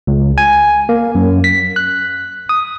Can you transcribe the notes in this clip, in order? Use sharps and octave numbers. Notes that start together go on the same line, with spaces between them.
C#2
G#5
A#3
F#2
B6
F#6
D#6